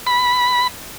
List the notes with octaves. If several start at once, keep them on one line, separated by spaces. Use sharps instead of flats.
B5